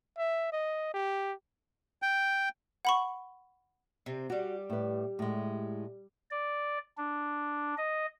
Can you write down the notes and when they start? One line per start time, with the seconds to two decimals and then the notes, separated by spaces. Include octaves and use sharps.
0.18 E5
0.52 D#5
0.93 G4
2.02 G5
2.85 F#5 B5 C#6
4.06 C3 C4
4.30 G3 F#4 G4
4.70 A2 B4
5.19 A2 G#3
6.31 D5
6.97 D4
7.77 D#5